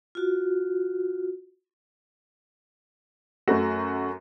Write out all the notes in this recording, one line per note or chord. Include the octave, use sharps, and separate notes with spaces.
F4 F#4
F#2 A3 F#4